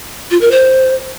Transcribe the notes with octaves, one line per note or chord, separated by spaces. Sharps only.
F4
A#4
C5